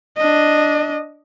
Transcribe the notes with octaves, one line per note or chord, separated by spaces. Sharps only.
D4 D#5